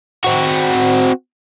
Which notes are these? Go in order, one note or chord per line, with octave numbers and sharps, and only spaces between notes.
C4 F#4